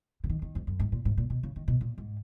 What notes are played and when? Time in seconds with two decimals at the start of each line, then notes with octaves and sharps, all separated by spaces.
0.24 C#3
0.29 D#3
0.42 D#3
0.55 F2
0.67 F#2
0.80 G#2
0.92 A#2
1.05 G#2
1.17 A#2
1.30 B2
1.43 C#3
1.56 D#3
1.68 B2
1.81 A#2
1.98 G#2